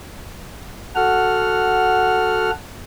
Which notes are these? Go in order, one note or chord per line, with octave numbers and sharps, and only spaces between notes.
F#4 A4 F#5 F6